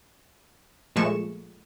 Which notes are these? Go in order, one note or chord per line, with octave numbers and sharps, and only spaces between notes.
A#2 F3 G#3 A3 C#6 E7